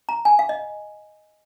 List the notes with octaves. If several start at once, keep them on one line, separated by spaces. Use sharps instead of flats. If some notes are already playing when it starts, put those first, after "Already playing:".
A#5
G#5
F5
D#5